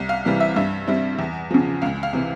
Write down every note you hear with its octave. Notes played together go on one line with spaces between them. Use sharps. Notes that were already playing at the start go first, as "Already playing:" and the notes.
Already playing: C2
F5
C3 E3 G3
E5
G2 E5
G3 C4 E4
E2
C#3 F3
C#2 F5
F5
C3 E3